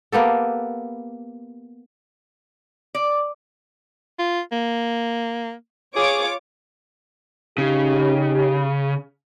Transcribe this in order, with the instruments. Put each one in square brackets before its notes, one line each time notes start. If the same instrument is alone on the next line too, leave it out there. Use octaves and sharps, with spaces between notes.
[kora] A#3 B3 G4 A4
[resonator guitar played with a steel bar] D5
[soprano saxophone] F4
A#3
[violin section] F4 C#5 D6 [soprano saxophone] G#4
[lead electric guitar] C#3 [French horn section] C#4 D#4 G4